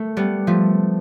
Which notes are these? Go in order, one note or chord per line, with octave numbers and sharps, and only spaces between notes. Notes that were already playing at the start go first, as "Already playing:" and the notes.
Already playing: A3
G3 B3
F3 A3